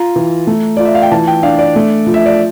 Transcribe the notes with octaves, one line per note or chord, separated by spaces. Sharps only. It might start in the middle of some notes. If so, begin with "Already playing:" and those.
Already playing: F4 A#5
E3
A3
F4 D5
E5
F5
G5
E3 A5
G5
D4 F5
D5
A3
F3
E5
D5